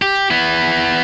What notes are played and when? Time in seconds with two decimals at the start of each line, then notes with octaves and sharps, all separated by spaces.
0.02 G4
0.30 B3 E4